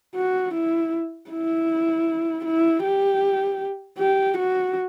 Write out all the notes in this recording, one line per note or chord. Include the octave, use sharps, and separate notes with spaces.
F#4
E4
E4
E4
G4
G4
F#4